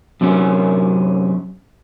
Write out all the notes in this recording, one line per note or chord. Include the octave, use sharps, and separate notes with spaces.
F#2 C3 F#3 C#4